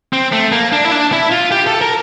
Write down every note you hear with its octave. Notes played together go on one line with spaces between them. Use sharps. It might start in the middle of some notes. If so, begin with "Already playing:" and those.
C4
A3
A#3
D4
E4
D4
E4
F4
G4
A4
A#4